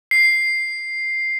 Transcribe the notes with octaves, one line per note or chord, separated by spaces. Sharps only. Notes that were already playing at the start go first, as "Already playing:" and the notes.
C7